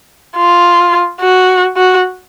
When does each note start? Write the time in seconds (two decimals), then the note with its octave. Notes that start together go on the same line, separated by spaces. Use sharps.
0.37 F4
1.21 F#4
1.77 F#4